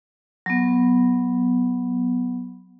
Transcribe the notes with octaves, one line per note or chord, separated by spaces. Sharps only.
F#3 B3